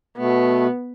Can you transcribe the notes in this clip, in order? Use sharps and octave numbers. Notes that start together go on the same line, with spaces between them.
B2 A3 B3